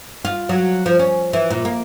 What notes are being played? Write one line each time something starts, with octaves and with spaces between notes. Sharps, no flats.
F4
F#3
F3
C#4
E3
A#2
A#3